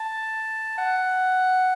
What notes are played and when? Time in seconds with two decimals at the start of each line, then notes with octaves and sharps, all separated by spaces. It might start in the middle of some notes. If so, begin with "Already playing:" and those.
Already playing: A5
0.78 F#5